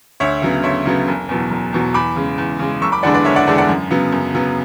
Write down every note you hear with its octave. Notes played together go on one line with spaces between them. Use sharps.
D2 C#5 E5
C#3 F#3 B3
D2 C#5 E5
C#3 F#3 B3
F#1
E2 B2 F#3
F#1
E2 B2 F#3
E2 B5 D6
C#3 G#3
E2
C#3 G#3
F#1 C#6 E6
B5 D6
E2 D3 G#3 D4 D5 F#5
B4 D5
F#1 C#5 E5
D5 F#5
E2 D3 G#3 D4
D5 F#5
F#2
C#3 F#3 B3
F#2
C#3 F#3 B3